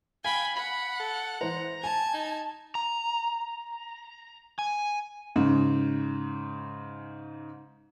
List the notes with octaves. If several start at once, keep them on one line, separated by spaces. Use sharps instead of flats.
F5 G5 G#5 B5
F#5 B5
A4
E3 C5 A#5
G#5 A5 G#6
D#4
A#5
G#5
G#2 C#3